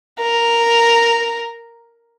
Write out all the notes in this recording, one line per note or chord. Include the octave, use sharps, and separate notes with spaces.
A#4